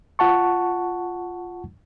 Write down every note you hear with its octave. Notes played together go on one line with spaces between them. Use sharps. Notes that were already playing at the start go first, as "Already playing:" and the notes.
F4 F#5 A5 C#6